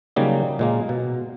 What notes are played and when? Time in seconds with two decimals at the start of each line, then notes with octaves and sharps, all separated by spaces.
0.16 C#3 F#3 G3 A#3 D#4
0.59 A#2 G#3 A#3
0.89 B2